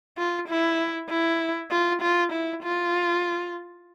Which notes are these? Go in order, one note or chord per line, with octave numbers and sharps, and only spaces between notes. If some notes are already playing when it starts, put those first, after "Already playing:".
F4
E4
E4
F4
F4
E4
F4